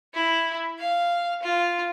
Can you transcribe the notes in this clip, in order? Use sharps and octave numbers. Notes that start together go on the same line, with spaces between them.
E4
F5
F4